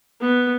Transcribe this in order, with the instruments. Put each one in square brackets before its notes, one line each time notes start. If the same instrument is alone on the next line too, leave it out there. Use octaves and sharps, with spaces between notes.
[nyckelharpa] B3